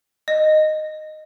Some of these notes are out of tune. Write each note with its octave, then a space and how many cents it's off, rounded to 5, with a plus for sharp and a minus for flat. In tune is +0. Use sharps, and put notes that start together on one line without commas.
D#5 -10